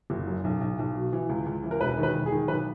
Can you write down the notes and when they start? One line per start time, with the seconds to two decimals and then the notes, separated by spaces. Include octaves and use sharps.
0.10 F#1
0.27 F#2
0.44 B1
0.61 B1
0.79 B1
0.95 B2
1.13 E3
1.29 C#2
1.46 C#2
1.63 E3
1.71 A#4
1.81 E1 B4
1.98 D#3
2.03 B4
2.14 E1
2.26 G#4
2.32 D#3
2.48 B1 B4